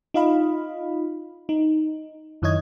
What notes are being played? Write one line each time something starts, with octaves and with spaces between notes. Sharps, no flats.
D#4 F4 D#5 F5 B5
D#4
F#2 D#3 E4 C#5 D#5 G#6